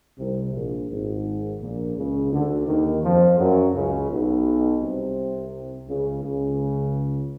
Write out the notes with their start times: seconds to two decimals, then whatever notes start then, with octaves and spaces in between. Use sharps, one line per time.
0.18 C2 C3
0.53 A#1 A#2
0.90 G#1 G#2
1.61 A#1 A#2
1.97 C#2 C#3
2.32 D2 D3
2.67 D#2 D#3
3.03 F2 F3
3.39 F#2 F#3
3.74 C#2 C#3
4.10 B1 B2
4.81 C2 C3
5.88 C#2 C#3
6.23 C#2 C#3